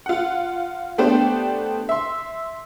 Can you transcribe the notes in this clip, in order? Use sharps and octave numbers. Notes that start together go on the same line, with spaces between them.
F4 F#5
A3 B3 D4 G4 C5
E5 C6